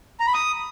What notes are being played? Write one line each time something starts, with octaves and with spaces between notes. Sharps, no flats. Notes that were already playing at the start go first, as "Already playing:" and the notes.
A#5
B5
D#6